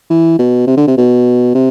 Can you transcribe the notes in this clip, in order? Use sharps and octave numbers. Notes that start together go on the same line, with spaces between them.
E3
B2
C3
D3
C3
B2
C3